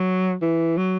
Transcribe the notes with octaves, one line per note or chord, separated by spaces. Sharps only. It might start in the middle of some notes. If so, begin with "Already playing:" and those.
Already playing: F#3
E3
F#3